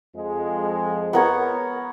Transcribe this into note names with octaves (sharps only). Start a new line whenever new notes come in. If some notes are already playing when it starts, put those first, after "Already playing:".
F2 F3 G#3
B3 A#4 C#5